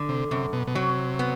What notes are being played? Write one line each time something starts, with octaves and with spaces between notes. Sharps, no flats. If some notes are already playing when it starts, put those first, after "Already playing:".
Already playing: D3
C3
F#2 C3
B2
B2
C3 F#3
B3